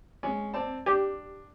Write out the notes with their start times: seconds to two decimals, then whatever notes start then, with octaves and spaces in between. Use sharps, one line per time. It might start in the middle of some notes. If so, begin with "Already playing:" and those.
0.23 G#3 C#4
0.54 C4 D5 A5
0.86 D4 G4